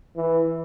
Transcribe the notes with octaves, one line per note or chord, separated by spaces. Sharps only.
E3